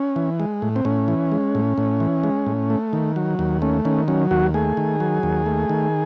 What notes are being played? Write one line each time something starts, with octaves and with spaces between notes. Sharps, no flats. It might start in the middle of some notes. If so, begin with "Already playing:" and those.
Already playing: C#4
E3
G#3
A2
C4
A2 C#4
E3
G#3
A2
A2
E3
G#3
A2
A3
D#3
F#3
D#2
A3 C#4
D#3 C#4
F#3 C#4
D#2 F#4
A3 G#4
D#3
F#3
D#2
A3
D#3